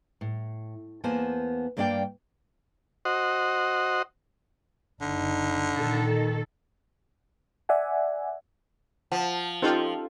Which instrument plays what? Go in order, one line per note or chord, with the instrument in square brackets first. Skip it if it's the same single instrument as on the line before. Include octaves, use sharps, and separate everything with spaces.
[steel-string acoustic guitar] A2
E2 A#3 B3 C5 G#5 A5
G2 A#3 D4 D5 F5 G5
[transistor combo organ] F#4 C5 D#5 F#5
[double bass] F#1 D#4 [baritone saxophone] D3
[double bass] A#2 [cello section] D#3 A4
[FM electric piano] D5 E5 F#5 G#5
[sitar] F3 [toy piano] F#5
[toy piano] C#4 [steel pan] D#4 G4 C5 [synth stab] F4 A4